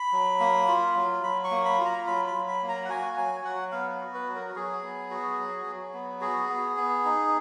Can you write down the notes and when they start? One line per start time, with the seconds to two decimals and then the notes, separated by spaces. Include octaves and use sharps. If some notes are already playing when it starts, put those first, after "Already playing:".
Already playing: B5
0.12 F#3
0.40 A#3
0.68 F4
0.96 F#3
1.23 F#3 B5
1.44 C#6
1.51 A#3
1.65 B5
1.79 F4
1.85 A#5
2.06 F#3 B5
2.27 B5
2.34 F#3
2.48 B5
2.62 A#3
2.69 A#5
2.85 F#5
2.89 F#4 G#5
3.17 F#3 G#5
3.45 F#3 F#5
3.72 B3 F5
4.00 F#4
4.14 B4
4.28 F#3
4.35 A#4
4.50 F#4
4.56 F#3 G#4
4.83 B3
5.11 F#4
5.39 F#3
5.66 F#3
5.94 B3
6.21 F#4 G#4
6.49 B3
6.77 B3
7.05 D#4